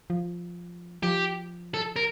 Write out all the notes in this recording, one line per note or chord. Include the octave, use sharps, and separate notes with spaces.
F3
F3 G4
A4
A#4